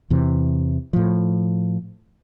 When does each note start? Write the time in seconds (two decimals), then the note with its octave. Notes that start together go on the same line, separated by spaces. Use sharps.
0.10 E2 C3 E3
0.93 A2 F3